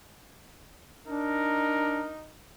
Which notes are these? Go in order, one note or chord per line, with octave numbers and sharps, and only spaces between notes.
D4 D#4 A#4